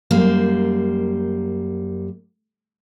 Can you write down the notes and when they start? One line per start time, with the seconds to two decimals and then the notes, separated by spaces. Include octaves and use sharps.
0.11 F#2 G3 A#3 C5